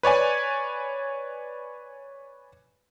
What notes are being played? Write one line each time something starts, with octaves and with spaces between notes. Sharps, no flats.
B4 C#5 D5 G#5